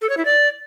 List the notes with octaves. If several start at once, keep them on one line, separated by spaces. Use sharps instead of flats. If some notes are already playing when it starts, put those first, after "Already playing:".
A4
C#5
E4
D5